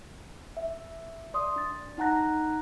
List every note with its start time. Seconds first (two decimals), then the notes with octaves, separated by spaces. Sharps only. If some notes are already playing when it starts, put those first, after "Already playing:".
0.57 E5
1.34 D5 C6 D#6
1.56 D4 A6
1.98 D#4 F#5 A5 A#5 F#6 A#6